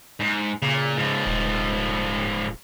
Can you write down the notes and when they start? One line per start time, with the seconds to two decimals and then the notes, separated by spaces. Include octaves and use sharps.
0.20 G#2
0.62 A#2 C#3
0.97 G#2 F3
1.26 D#1